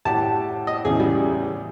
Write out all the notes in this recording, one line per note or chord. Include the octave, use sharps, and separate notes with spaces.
A2 G4 F#5 A5
D#5
E2 A2 C#3 G#4
G3